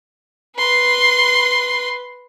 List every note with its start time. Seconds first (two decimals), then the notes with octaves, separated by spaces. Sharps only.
0.57 B4 C6